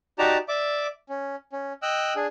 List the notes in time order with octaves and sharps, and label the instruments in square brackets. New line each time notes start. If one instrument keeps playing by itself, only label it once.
[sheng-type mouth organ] D#4 F#4 G4 D5 A5 A#5
D5 E5 D6
C#4
C#4
D#5 G5 E6 F#6
D4 G#4